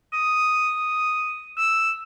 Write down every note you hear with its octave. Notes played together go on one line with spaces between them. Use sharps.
D#6
E6